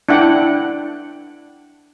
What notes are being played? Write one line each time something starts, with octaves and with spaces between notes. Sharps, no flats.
D4 E4 F#5 G5